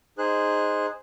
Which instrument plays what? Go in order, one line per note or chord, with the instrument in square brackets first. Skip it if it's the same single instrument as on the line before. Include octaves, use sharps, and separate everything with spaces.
[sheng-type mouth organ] D#4 G#4 C5 F#6